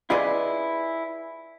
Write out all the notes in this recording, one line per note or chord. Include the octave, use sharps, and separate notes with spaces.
E4 F4 G#4 B4 D5 D#5